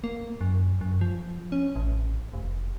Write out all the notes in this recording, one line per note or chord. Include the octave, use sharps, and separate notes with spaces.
A#3
F#2
F#2
F3
C#4
A1
F1